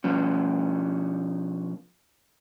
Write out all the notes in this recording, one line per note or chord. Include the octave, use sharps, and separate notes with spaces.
B2 F3 C#4